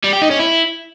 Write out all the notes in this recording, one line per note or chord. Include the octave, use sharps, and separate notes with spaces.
G3
G4
D#4
C#4
E4